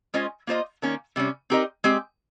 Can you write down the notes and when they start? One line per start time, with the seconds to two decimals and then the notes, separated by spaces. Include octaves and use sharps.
0.14 G#3 C#4 F4 C5 D#5
0.47 A#3 F4 C5 D#5
0.82 D#3 A#3 C#4
1.16 C3 G3 C#4
1.50 C4 D#4 G4 A#4 D#5
1.84 G#3 C4 G4